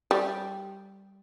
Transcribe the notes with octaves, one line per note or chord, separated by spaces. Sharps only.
G3